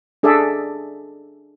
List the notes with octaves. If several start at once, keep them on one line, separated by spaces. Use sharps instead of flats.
D4 G#4 A4 D5 E5